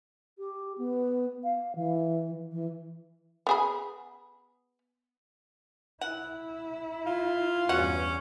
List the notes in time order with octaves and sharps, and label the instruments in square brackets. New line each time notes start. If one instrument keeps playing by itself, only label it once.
[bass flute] G4
B3
F5
E3
E3
[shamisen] B3 G#4 B5
[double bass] E4 [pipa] F#5
[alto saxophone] F4
[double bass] E2 G2 [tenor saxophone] C#4 [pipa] F#4 F#5